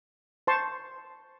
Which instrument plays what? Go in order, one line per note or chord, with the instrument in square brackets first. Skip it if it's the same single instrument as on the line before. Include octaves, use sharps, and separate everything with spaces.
[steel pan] C5 A5 C6 C#6